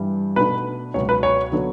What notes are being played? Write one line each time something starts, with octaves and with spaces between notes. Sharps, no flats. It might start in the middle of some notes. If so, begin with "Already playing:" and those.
Already playing: G2 E3 G3 D4
B2 A3 D4 B4
C#2 B2 F#3 B3 C#5
B4
C#5
D3 F#3 B3 D4